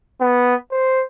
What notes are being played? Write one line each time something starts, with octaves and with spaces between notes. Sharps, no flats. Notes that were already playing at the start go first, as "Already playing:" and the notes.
B3
C5